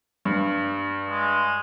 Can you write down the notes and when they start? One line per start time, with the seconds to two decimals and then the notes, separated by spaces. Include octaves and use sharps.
0.25 G2
1.09 G#3